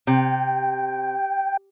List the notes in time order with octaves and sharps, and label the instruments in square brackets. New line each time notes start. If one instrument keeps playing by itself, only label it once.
[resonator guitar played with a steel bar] C3 [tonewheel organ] G5